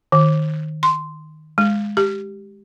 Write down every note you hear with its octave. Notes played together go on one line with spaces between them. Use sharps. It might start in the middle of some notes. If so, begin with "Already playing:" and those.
D#3
C6
G#3
G4